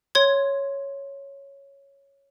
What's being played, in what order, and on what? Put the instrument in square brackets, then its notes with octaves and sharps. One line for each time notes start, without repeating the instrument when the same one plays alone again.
[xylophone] C#5 C6 G#6